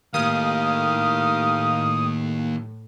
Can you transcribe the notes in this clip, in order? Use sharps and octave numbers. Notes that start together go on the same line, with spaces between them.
D#2 A2 G4 A#4 F5 D#6